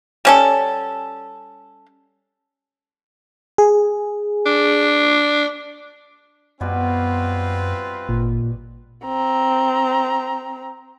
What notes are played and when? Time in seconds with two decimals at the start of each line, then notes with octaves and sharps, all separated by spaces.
0.25 G3 C#4 A4
3.58 G#4
4.46 D4
6.61 F#2 B2 G3 C4 F4 B4
8.09 G#1 A#2
9.05 C4 A#5